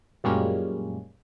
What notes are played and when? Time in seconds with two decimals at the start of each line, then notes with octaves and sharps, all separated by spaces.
0.24 F#2 A#2 G3 G#3 A#3 C#4